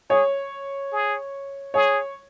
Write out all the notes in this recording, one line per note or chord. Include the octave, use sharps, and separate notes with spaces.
G#4 C#5
G#4
G#4 C#5